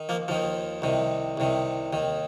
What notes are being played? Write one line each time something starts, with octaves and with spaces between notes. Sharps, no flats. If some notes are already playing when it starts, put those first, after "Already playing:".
Already playing: D#3
F3 A#3
D#2 D#3 F3
C2 C3 D#3
C2 C3 D#3
D#2 D#3